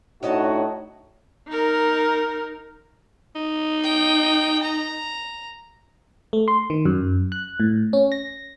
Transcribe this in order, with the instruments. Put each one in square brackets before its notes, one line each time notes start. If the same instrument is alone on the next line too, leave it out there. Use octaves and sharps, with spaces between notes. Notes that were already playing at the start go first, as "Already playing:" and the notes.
[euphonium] A2 [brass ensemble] D4 D#4 F#4 [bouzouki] C#5 D#5 A5
[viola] D#4 A#4
[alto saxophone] D#4
[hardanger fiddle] G5
A#5
[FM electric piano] A3
C6
D#3
F#2
F#6
A2
C#4
A#6